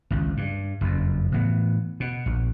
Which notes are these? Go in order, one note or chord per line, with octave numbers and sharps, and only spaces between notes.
G#1 C#2
G2
F#1 F2
A2 E3 B3
B2
A#1